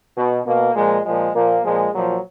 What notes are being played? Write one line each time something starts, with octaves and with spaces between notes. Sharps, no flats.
B2
B2 A#3
A#2 F3 G#3
A#2 F3 G#3
A#2 F3 A#3
A#2 F3 G#3
A#2 F3 F#3